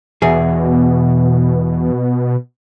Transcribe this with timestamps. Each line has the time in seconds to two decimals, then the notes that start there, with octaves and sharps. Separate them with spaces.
0.22 E2 B2 G#4